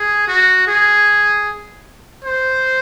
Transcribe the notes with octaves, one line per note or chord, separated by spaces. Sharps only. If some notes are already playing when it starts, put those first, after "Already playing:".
Already playing: G#4
F#4
G#4
C5